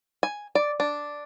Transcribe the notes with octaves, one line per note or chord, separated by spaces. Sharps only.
G#5
D5
D4